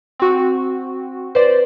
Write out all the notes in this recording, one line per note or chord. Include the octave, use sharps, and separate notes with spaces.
C4 F#4
B4 C5 D5